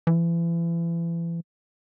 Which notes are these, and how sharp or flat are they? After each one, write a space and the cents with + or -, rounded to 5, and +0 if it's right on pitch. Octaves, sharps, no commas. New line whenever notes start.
E3 +35